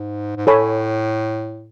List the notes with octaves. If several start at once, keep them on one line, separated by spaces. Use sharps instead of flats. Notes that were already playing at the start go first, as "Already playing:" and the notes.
Already playing: G#2
G#2
A2 A4 C#5 G#5 B5